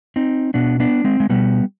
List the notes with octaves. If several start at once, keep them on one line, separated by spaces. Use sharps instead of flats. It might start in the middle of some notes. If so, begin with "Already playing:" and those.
C4 D#4
B2 B3 D4
B3 D4
G#3 C4
G#3
B2 G3 B3